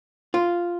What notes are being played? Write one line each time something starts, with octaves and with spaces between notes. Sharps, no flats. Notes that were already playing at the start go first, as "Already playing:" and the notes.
F4